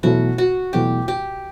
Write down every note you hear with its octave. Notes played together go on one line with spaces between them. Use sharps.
E2 B2 F#3 A3 E4 F#4
F#4
E2 B2 F#3 A3 E4 G4
G4